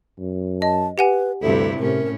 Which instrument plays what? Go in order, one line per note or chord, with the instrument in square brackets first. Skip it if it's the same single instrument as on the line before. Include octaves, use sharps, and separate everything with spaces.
[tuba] F#2
[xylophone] D#5 [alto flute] A5
[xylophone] G4 F#5 G#5 [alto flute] B4
[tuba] D2 [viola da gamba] G2 C3 E4 [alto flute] A4
[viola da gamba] A2 C#4 [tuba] C3 [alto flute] A#4